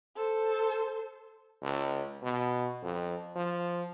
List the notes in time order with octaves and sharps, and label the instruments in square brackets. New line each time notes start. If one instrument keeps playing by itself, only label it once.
[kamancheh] A4 C5
[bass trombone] C#2
B2
F2
F3